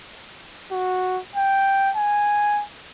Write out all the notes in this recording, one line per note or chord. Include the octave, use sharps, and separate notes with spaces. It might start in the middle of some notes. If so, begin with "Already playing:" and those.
F#4
G5
G#5